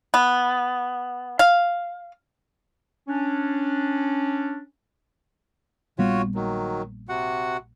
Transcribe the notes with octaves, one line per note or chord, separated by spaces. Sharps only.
B3
F5
C#4 D4
A#1 G3 B3 F4 F#4 C#5
D#3 F#3
C3 F#4 F#5